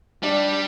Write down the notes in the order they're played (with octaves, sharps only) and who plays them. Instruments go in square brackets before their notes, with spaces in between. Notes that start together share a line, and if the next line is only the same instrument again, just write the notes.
[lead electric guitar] G3 [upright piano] D4